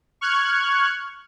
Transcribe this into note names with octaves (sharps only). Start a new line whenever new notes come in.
C#6 F6 F#6 G#6